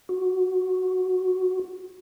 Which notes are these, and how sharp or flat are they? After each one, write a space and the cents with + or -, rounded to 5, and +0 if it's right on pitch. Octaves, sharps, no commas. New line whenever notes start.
F#4 +0